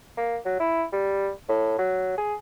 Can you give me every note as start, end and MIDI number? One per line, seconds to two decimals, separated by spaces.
0.17 0.37 58
0.45 0.60 54
0.60 0.85 64
0.92 1.30 55
1.49 1.76 45
1.78 2.16 54
2.18 2.35 68